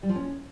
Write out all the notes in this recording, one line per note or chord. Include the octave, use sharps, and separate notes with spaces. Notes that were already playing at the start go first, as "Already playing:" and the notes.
G3
F3
C#4